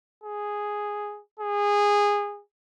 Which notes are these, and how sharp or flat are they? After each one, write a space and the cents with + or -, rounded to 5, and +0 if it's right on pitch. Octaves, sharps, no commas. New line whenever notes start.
G#4 +0
G#4 -20